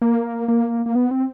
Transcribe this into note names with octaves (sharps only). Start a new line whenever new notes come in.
A#3
A#3
A#3
B3
C4